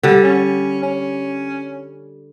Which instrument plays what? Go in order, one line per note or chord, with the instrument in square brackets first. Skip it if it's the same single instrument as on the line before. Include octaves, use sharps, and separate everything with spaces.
[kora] D3 G3
[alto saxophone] C#4
C#4